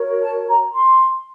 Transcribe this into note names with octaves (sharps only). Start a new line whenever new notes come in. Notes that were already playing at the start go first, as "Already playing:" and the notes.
Already playing: F#4 A#4 C#5
A5
A#5
C6